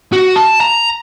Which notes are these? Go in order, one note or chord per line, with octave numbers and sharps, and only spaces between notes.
F#4
A5
A#5